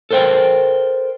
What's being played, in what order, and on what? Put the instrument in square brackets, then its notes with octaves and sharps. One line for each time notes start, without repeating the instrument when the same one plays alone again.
[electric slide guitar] A4 A#4 C5 F5 G5